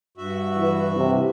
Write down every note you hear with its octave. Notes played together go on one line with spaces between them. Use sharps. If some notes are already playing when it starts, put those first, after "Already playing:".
G2 F#4 E5
E3
C3